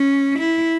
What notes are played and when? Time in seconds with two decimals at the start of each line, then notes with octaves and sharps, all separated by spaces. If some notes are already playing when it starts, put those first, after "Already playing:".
Already playing: C#4
0.39 E4